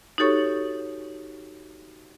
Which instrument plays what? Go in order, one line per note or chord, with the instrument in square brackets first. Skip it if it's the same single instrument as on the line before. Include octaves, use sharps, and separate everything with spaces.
[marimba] D#4 F#4 G4 A4 C#5 C#6